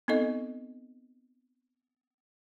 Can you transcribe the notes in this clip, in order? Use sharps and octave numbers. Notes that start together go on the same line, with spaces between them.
B3 C4 D#4 A4 D#5